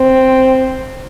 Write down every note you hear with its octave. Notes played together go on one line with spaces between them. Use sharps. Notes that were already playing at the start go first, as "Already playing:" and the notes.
Already playing: C4